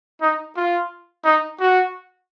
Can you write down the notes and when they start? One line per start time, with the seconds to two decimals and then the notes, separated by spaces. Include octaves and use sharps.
0.22 D#4
0.57 F4
1.24 D#4
1.60 F#4